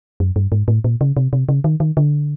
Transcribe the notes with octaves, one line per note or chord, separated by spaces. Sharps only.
F#2
G2
G#2
A2
A#2
C#3
C3
C3
C#3
D#3
D#3
D3